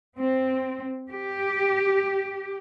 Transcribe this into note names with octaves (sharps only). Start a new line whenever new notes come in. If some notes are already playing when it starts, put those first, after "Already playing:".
C4
G4